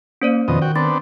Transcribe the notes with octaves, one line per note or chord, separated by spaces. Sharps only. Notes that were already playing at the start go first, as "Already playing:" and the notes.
A#3 C#4 C5 D5
F2 B2 D#3 D#5
F#4 G5
B3 C4 D4 A6